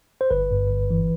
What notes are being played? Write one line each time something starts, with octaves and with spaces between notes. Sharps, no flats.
C5
G1 B4
G2
G1
E3